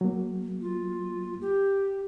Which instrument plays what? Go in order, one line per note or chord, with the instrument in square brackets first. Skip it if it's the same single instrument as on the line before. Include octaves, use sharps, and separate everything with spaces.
[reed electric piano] F#3 A#3
[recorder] F4
G4